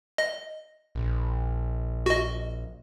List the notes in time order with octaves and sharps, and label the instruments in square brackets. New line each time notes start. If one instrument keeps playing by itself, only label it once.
[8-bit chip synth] D#5
[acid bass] A#1
[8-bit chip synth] F#4 D#5